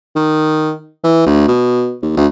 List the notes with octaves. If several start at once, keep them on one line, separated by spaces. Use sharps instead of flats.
D#3
E3
D2
B2
D#2
D2